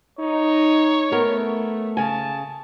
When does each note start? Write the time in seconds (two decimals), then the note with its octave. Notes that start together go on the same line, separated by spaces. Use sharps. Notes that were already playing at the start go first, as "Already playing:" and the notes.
0.19 D#4 C#5
1.12 A3 B3 A#4
1.97 C#3 G#5 A5